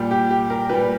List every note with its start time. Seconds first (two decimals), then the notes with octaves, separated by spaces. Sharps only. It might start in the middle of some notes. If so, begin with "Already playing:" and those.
Already playing: A#2 G3
0.11 G4
0.31 G4
0.50 A#4
0.69 A#2 G3 B4